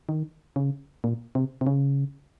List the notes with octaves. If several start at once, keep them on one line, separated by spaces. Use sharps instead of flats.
D#3
C#3
A#2
C3
C3
C#3